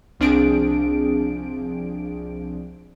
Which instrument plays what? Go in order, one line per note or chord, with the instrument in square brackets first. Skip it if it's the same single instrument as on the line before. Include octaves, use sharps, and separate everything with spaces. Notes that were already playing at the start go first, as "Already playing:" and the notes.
[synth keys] C2 F3 C4 D4 G#4 D7